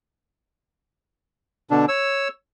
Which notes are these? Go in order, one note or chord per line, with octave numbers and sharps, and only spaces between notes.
B2 D3 D4
C#5 E6